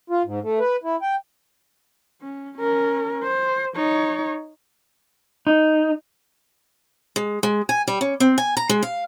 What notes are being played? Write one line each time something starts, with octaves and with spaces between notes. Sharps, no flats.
F4
G#2
A3
B4
E4
G5
C#4
C#4 A#4
C5
D#4 C#5
D#4
G#3
G#3
G#5
G3
C#4
C4
G#5
A#5
G#3
F5